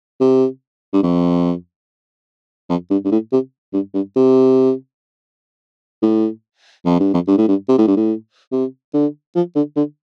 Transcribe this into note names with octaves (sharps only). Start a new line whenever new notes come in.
C3
G2
F2
F2
G2
G2
A2
C3
G2
G2
C3
A2
F2
G2
F2
G2
A2
G2
C3
A2
G2
A2
C3
D3
F3
D3
D3